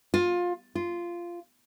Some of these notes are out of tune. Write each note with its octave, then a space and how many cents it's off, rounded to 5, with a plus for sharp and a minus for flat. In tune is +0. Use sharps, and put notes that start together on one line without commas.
F4 +20
F4 -10